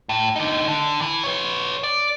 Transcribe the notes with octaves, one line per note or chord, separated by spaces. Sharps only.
A2
D3 D#4
D3
E3
B4 C#5
D5